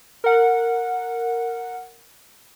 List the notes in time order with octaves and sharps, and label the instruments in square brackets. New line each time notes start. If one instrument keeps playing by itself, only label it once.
[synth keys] A#4 F#5